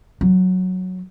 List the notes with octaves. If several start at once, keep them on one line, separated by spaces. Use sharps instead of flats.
F#3